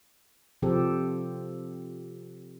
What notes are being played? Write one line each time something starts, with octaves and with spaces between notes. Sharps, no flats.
C3 F3 C4 G4 A4